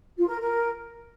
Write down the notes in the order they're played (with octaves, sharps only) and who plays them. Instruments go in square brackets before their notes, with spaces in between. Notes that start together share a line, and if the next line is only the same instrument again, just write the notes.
[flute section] F4
A#4
A#4